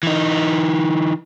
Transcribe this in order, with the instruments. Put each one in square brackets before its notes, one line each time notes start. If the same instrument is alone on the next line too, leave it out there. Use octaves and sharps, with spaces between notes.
[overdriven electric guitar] E3 D#4